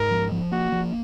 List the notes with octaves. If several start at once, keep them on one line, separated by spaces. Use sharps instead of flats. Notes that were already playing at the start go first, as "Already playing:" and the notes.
Already playing: G#2 A#4
F3
F3
A#3 F#4
F3